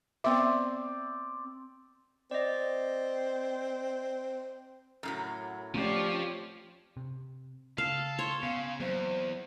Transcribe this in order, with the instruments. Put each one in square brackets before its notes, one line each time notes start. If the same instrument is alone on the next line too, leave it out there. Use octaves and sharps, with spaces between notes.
[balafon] B3 E5 [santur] C4 D5
[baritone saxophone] C4 [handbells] D5 D#5
[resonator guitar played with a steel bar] F#2 A2 F#3
[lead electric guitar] F3 [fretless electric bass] A3 C4 C#4 [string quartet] G4 C#5 D5
[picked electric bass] C3
[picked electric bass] C#3 [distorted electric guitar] A4 [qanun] F5
[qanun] C#5 [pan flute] C6
[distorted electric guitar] C#3 [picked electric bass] B3 [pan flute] F5
[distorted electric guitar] E2 [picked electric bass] F#3 A#3 C4 [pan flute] C5